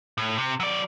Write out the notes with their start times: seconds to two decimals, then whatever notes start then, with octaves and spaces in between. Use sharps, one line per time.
0.18 A2
0.38 C3
0.60 F#3 D5